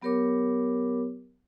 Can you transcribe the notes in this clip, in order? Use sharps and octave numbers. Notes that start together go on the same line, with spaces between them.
F#3 B3 G4 A#4 C#5 D6